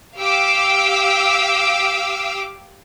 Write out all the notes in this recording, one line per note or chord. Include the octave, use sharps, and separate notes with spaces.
G4 F5 D6 E6